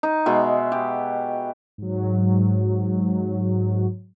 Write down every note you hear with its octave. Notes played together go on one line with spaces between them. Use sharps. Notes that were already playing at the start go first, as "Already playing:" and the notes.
D#4
B2 G#3 E5
G4
G#2 F#3